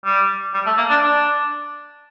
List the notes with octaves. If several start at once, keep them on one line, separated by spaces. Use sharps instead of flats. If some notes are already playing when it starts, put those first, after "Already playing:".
G3
G3
A3
A#3
D4
D4